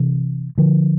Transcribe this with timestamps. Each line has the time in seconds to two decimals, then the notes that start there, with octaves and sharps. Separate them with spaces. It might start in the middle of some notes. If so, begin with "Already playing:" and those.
Already playing: C3 E3
0.58 D3 F3